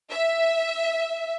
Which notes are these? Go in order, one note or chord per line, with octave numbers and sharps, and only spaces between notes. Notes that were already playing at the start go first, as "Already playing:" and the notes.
E5